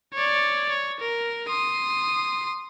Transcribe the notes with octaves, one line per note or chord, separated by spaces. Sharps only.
C#5 D5
C#5
A#4
C6 D#6